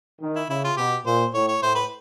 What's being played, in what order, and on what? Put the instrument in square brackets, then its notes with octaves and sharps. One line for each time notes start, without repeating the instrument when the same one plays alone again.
[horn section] D#3
[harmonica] E4
[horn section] C#3 [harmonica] E4
[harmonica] F4
[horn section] B2 [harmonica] G4
[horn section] A#2 [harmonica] C5
[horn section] A2 [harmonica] C#5
[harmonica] C#5
[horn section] A2 [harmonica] C5
[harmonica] B4